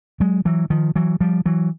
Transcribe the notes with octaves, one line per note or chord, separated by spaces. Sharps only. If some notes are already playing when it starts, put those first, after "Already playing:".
F#3 G#3
E3 F#3
D#3 F3
E3 F#3
F3 G3
E3 F#3